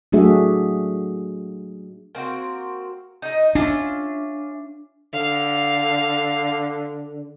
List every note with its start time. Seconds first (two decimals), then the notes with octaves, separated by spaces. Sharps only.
0.12 F#3 A3 D4 F#4 G#4 E5
2.15 A#3 C4 F#4
3.22 D#4 D#5
3.55 C#4 D4 F4 E5
5.14 D3 F5